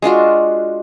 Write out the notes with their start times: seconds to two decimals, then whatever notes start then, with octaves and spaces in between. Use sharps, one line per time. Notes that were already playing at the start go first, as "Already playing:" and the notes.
0.02 G#3 D4 F4 F#4